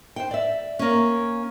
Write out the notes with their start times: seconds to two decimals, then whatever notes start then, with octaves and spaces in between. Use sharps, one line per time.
0.16 C5 C#5 G5
0.31 D5 E5
0.79 A#3 C#4